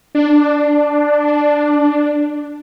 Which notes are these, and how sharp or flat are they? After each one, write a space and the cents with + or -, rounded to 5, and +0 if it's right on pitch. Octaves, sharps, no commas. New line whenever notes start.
D4 +5